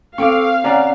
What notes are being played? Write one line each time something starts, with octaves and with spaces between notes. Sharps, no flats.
C4 A4 F5 C#6 D6 D7
C3 C#4 D5 F#5 A#5